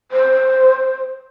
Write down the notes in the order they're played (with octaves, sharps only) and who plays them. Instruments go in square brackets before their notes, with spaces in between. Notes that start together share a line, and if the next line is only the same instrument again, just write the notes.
[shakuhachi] C5